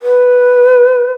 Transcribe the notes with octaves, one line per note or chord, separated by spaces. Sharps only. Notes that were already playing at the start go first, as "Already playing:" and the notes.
B4